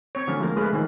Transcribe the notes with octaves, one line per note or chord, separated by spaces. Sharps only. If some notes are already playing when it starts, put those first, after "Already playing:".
C4 C#5
D3 F#3 A3 C#4
F3 G#3 A#3 F4 A4 A#4
G#3 A3 F4 G#4 B4
D#3 E3 C#4